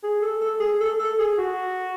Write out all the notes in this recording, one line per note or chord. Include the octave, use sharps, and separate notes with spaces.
G#4
A4
A4
G#4
A4
A4
G#4
F#4